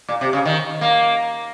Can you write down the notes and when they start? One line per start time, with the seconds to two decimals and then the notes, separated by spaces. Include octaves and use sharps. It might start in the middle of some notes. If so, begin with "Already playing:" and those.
0.09 A#2
0.21 C3
0.33 C#3
0.45 D#3
0.81 A#3